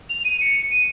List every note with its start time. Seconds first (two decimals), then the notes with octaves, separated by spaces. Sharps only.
0.10 F7
0.25 D#7
0.41 C#7
0.71 D#7